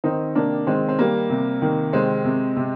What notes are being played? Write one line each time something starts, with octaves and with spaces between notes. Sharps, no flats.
D#3 C4 D#4
C3 A#3 D4
D#3 G#3 C4
C4
G3 A#3
C3
D#3
C3 G#3 C4
C3
C3